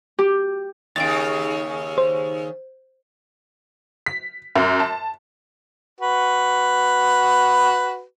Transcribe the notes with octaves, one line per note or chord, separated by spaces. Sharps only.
G4
D#2 A#2 C#3 A6 D7
C5
B6
F#2
A5
F#4 B4